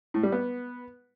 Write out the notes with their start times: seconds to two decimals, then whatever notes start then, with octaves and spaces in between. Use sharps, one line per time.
0.14 A2
0.23 G3
0.32 B3